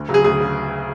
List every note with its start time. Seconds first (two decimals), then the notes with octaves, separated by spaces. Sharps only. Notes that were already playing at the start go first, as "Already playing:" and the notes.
Already playing: D2
0.09 C#3 F#3
0.14 G#4
0.24 D2 G#4
0.41 C#3